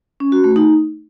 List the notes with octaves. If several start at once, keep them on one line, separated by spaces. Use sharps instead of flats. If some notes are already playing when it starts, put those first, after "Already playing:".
C#4
F#4
A3
D#4